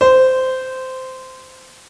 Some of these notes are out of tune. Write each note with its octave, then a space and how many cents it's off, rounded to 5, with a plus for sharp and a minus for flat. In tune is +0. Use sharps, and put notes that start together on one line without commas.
C5 -15